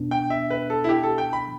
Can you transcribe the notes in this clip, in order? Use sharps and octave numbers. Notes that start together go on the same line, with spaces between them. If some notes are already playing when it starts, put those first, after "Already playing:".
Already playing: E2 B2 B3 D4
G5
E5
B4
A4
E4
G4
A4
G5
B5